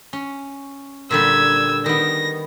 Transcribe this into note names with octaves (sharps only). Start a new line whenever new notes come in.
C#4
A#2 D3 G3 E6 G#6
D#3 B3 A#6